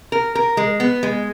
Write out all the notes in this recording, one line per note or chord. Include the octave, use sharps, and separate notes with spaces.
A#4
A#4
G#3
B3
G#3